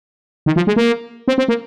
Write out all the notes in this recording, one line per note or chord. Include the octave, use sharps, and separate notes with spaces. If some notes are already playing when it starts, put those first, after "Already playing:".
D#3
F3
G#3
A#3
C4
C4
A#3